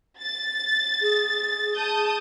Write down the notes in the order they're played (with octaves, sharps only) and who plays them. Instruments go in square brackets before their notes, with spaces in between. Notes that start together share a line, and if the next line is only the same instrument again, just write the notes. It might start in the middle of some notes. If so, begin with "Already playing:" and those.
[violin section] A6
[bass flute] G#4
[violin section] A5 D#6 G6